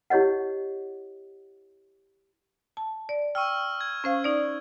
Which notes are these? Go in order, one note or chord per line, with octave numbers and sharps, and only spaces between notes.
E4 G4 C#5 D#5 F#5
A5
D5
G5 C#6 E6 F6
G#6
C#4 C5 F5
D#4 D5